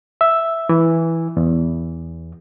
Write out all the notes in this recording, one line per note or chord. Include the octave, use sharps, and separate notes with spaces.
E5
E3
E2